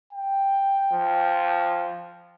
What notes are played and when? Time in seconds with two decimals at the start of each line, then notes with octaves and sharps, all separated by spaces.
0.13 G5
0.92 F3